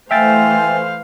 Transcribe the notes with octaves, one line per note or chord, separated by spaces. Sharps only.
E3 A3 C5 E5 F5 G5 G#5 A6